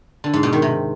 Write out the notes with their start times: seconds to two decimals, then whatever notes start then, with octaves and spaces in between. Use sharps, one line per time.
0.24 D3
0.33 G#2
0.43 B2
0.53 D#3
0.62 C3